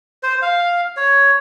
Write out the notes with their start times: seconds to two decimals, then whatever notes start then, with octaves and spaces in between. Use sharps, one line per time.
0.23 C5
0.42 F5
0.97 C#5